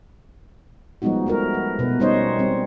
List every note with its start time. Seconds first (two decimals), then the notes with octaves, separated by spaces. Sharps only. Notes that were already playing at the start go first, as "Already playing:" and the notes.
1.02 F3 G3 G#3 B3 D#4 F#4
1.26 A3 F#4 A#4
1.54 B4
1.79 B2 B4
2.00 G3 C#4 D#4 C5 C#5 D#5
2.39 G3 C4